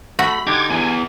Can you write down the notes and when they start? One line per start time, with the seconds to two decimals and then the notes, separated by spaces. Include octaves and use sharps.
0.19 A3 F#4 B5
0.47 D3 D4 D#4 G4 D6 G#6
0.69 E2 E3 G#5